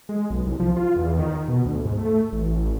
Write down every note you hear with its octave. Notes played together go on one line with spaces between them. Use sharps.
G#3
B1
C2
F3
F4
E2
D#3
B2
D2
G#2
A3
A1